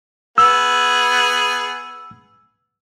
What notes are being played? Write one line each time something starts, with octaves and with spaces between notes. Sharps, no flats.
B3 G#4 E6